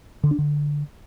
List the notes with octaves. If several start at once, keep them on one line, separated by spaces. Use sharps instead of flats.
D3
D4
D3